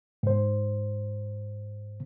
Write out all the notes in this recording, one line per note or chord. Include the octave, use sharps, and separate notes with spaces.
G#2 C5